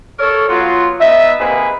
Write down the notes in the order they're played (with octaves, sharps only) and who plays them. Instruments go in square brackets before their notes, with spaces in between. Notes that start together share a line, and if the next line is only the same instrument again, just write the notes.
[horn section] A4 A#4 C#5
F#3 B3 F4
B3 D#4 E5
C3 D#3 A#3 G#4 B4